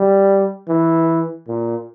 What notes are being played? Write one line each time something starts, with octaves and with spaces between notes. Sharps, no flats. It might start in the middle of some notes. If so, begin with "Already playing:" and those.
Already playing: G3
E3
A#2